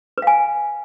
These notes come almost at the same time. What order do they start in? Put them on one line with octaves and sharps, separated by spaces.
B4 F5 G#5